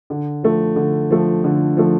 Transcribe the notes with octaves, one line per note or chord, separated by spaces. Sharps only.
D3
F3 A3
D3
F3 A3
D3
F3 A3